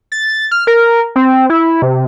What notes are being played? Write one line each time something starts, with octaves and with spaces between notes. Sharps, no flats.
A6
F6
A#4
C4
E4
C3